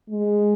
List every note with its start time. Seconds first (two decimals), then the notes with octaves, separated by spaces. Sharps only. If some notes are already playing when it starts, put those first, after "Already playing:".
0.10 G#3